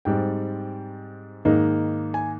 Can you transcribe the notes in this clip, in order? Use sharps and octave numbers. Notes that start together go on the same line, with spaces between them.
G#2 G3 C4 G5
G#2 D#3 A#3 D#4
G#5